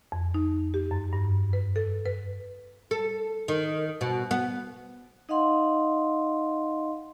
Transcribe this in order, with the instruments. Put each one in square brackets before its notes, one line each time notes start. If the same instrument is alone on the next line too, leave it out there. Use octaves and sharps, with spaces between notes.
[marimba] F2
D#4
G4
F#2
G2
B4
A4
B4
[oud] A4
D#3
B2
B3
[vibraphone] D#4 D#5 F5 F#5 C6